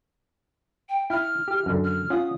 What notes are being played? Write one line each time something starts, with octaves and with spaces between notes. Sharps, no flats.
G5
E4 G5 F6
G4
F#2 D3
F6
C#4 F4 F#5 D#6